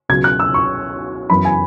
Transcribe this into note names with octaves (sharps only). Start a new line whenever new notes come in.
C#2 B2 F#3 G#6
F#6
E6
C#6
F#2 E3 B3 B5
G#5